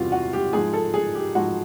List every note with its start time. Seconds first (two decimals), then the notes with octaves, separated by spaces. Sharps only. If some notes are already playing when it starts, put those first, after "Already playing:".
Already playing: E2 C3 E3 G3 F4 F#4
0.12 F#4
0.33 G4
0.53 G#2 F3 G#4
0.73 A4
0.94 G#4
1.15 G4
1.35 G#2 F3 F#4